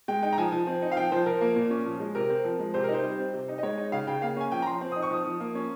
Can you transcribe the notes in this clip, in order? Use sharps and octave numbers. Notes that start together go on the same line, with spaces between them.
G#3 G5
D#4 G5
A#5
F3 G#5
F3
C4
D#4
F5
F3 G5
F3 C5
F3 A#4
A#3
A#2
C#4
F3
G#3
C3 A#4
C4
F3
G#3
C3 C5
A#4
D#4
C5
G3
C4
C3
D#4
D#5
G#3 C#5
D#4
C#3 F5
C#3 G5
A#3 F5
C#4 G#5
F3 G5
A#5
F3 C6
C4
D#4 D#6
C#6
F3 D#6
F3
A#3
C#4